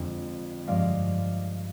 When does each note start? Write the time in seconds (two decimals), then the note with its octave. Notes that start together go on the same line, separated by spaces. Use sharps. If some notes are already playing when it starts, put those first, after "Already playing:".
Already playing: F2 D3 G#3
0.67 G2 F3 G#3 D5 F5